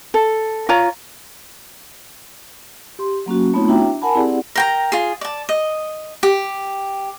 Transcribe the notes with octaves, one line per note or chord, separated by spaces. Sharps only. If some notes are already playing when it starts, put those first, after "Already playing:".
A4
F4 C#5 A#5
G4 C6
F#3 A#3 C#4 F#4
A3 B3 C4 D#4 F4 C#5
D4 E4 F#4 E5 G5 A#5
A#4 F#5 G#5 A5 B5
C4 E4 G4 G#4 D5 F#5
A#4 G5 A#5
F4 G#4
D5 A5
D#5
G4